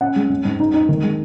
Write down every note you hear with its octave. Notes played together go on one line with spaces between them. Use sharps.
C#4 F#5
G#3
G#3
G#2
D#4
D#4
D#3
G#3